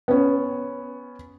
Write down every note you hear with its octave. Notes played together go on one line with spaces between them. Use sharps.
B3 C#4